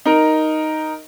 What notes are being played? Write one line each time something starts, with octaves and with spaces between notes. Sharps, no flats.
D#4 A#4